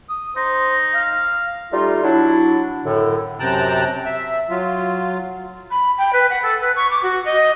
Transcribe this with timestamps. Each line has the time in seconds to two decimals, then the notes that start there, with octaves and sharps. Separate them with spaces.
0.09 D#6
0.36 D#4 C5
0.95 F5
1.72 G3 A3 D#4 F4
2.03 F#3 D4 E4
2.85 F#2 A2 D3
3.40 F#2 C3 G5 A5 A#5 F#6
4.05 E5
4.50 F#3 F4
5.70 B5
5.97 G5
6.12 B4
6.29 F#5
6.42 A4
6.61 B4
6.76 C#6
6.90 D6
7.02 F#4
7.25 D#5